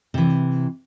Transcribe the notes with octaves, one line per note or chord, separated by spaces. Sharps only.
C3 E3